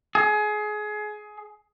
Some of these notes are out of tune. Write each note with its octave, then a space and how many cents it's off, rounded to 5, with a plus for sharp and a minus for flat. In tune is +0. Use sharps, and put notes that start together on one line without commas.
G#4 +25